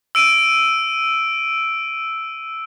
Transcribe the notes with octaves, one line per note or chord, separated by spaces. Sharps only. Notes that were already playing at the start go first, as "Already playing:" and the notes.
E6 D7 D#7